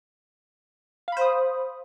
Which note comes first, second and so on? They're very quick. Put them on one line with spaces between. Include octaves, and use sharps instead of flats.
F5 B5 C5 D#6